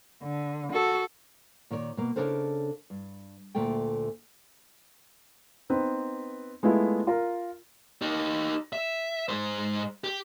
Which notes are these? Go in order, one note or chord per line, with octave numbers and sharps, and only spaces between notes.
D3
F#4 A4
A#2 D#3 C#5 D5
B2 A#3
C#3 G3 D4 A4 A#4 C5
G2
D2 A#2 A3 A4 G5
B3 C4 D#4 B4
G#3 A3 B3 E4 F4
F4 A#4
D#4 G4
E5
G#2 C5
G4